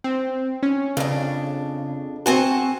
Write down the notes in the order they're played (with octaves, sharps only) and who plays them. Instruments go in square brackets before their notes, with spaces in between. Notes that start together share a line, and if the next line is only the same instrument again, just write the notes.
[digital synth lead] C4
C#4
[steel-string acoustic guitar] F2 D4 [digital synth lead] C#3
[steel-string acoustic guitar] C4 G#5 A5 [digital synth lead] F#4